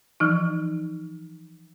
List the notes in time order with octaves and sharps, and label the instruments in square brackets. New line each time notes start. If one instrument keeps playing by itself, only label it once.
[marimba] E3 F3 D#4